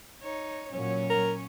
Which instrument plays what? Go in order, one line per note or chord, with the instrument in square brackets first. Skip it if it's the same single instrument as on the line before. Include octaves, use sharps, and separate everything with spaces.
[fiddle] D#4 C#5
[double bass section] A#2 F#3 [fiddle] C#4 C#5
[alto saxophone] A#4